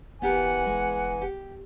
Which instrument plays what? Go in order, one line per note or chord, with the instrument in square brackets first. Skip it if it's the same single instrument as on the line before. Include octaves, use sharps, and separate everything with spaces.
[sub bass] F1 [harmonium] E3 G#5 [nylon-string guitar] B3 G4 A#4 [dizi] F#5
[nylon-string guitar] G#3
G4